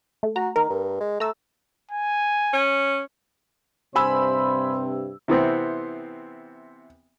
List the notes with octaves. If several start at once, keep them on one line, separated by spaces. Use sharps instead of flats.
A3
F#4 A#5
D#3 A#4
G2
G#3
A3 A#5 E6
G#5
C#4
G2 C3 C5 G#5 B5 E6
C3 E3 B3 C4